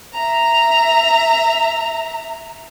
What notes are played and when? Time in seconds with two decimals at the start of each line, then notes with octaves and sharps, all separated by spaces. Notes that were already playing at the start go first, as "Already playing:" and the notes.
0.14 E5 A#5